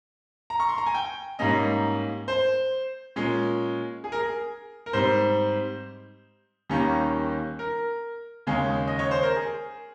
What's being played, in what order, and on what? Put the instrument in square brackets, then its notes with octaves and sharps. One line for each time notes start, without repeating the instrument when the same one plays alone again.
[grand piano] A#5
C#6
C6
A#5
G#5
G5
G#2 G3 A#3 C#4 D#5
C5
A#2 G#3 C#4
G#4
A#4
G#4
A#4
G#2 G3 C4 C5
D#2 D#3 G3 A#3 C#4
A#4
D#2 C#3 G#3 C#4
D#5
C#5
C5
A#4
G#4